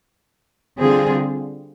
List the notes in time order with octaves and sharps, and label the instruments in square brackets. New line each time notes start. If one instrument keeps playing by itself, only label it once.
[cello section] D3 G3 C4 F4 G#4